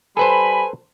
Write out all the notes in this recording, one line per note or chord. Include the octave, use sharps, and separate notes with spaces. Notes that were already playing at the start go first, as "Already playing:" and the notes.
G3 A4 B4 C5 G#5 B5